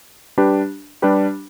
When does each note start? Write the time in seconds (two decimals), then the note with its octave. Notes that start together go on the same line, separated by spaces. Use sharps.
0.38 G3 D4 G4 B4
1.02 G3 D4 G4 B4